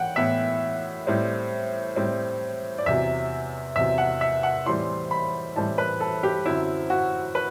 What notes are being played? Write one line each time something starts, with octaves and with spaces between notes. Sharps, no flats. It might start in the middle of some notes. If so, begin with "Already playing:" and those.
Already playing: A2 E3 F#5 G5
A2 E3 B3 E5
A2 G3 C4
A2 G3 C4
D5
E2 C3 F#3 E5
E2 C3 F#3 E5
F#5
E5
F#5
A2 E3 G3 C4 C6
B5
A2 E3 G3 C4 A5
B4
A4
G4
F#2 D3 F#3 C4 E4
F#4
B4